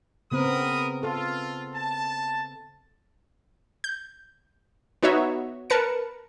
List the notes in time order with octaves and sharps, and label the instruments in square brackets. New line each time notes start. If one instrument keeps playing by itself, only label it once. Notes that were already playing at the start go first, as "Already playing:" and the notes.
[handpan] C#3 B3 C4 [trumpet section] A#4 B5 D#6
[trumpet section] F4 [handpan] A4
[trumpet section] A5
[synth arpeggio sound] G6
B3 D#4 F#4 C#5 D#5 E5
A#4 B4 A5 C#7